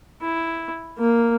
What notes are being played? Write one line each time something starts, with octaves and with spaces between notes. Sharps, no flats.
E4
A#3